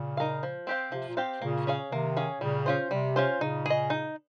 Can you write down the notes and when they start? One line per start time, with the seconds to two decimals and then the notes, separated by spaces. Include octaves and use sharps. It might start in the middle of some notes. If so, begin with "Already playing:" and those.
Already playing: A#2 C#3
0.17 D#4 A#4 F5
0.43 F3
0.67 C4 G4 C5 F5
0.92 C3 F3
1.09 A#2
1.17 C4 G4 C5 F5
1.42 A#2 C#3 A#3
1.67 C#4 G#4 C#5 F5
1.91 C3 D#3 A#3
2.17 C#4 G#4 C#5 F5
2.41 A#2 C#3 G3
2.66 C#4 F4 C5
2.91 C3 G3
3.16 C#4 F4 C5
3.41 A#2 C#3 D#4
3.66 G#4 D#5
3.90 D#4